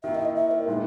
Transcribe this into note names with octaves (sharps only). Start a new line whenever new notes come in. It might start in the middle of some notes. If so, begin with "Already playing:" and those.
D#3 A#3 E4 E5
D#5
E5
E5
A#4
A#2 G#3 B3 D#4